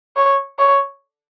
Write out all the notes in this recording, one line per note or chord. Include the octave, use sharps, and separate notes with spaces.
C#5
C#5